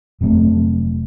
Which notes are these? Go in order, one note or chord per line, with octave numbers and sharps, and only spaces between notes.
F1 C3 F#3 A3